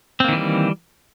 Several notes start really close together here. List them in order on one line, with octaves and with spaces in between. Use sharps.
C4 A#3 D#3 E3 G3